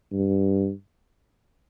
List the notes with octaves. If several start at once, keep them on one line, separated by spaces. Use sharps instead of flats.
G2